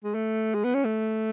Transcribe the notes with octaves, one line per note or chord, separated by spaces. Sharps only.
G#3
A3
G#3
B3
C#4
A3